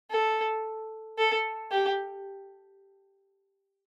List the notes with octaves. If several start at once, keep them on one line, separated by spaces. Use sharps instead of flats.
A4
A4
G4